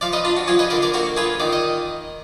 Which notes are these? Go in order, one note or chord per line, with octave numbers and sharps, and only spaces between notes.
F3 D5 F5
B4 D#5
D4 F4
F#4
F3 F4 G#4
B4 D#5
D3 A#4 D5
A#4 D5
A#3 F#4 A#4
F4 G#4 B4
D#3 D5
D#5